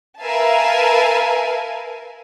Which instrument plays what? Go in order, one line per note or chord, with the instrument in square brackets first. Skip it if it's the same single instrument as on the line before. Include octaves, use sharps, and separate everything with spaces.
[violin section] A#4 B4 E5 F5 G#5 A5